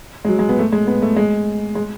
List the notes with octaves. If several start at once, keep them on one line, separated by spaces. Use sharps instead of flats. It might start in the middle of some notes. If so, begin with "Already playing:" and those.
G#3
F#3
G#3
B3
A3
G#3
B3
A3
G#3
G#3